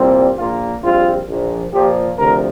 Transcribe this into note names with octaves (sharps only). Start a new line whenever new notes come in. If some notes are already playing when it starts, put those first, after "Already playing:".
Already playing: C2 A#2 G3 C4
A#1 A#2 A#3 F4
A#1 A#2 G3 C4 F4
A#1 A#2 F3
A#2 F3 A#3 G4
D2 C3 F3 A#4